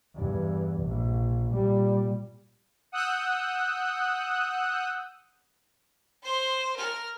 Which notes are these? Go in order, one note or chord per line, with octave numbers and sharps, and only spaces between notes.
E2 G2
A#1
A#2 G3
F#5 D#6 E6 F#6 G6
C5 C6
A#4 F6